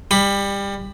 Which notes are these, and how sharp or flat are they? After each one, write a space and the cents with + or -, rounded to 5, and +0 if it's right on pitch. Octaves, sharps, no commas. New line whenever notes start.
G3 +25 B5 +0